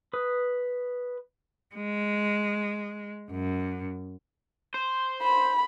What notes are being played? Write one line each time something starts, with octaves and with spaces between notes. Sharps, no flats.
B4 D#6
G#3
F#2
C5
B5